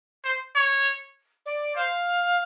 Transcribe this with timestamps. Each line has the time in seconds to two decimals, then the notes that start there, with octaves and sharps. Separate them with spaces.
0.24 C5
0.55 C#5
1.45 D5
1.76 C5 F5